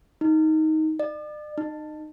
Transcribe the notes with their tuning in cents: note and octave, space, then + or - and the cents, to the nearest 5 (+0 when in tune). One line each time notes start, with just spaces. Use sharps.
D#4 +15
D5 +40
D#4 -25